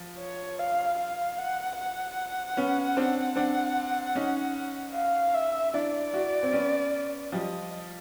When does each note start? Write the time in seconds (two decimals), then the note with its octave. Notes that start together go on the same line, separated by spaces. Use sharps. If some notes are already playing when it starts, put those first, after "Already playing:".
Already playing: F3
0.19 C#5
0.59 F5
0.98 F5
1.38 F#5
1.77 F#5
2.57 B3 C#4
2.97 C4 D4
3.36 C4 D4
4.16 C#4 D#4
4.95 F5
5.34 E5
5.74 D4 E4 D5
6.14 E4 F#4
6.43 C4
6.53 B3 C#4
7.32 F3 G3 D#5